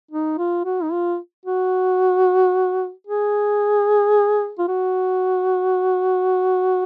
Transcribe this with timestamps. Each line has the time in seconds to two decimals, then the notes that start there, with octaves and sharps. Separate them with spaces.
0.11 D#4
0.38 F4
0.65 F#4
0.83 D#4
0.92 F4
1.46 F#4
3.07 G#4
4.59 F4
4.68 F#4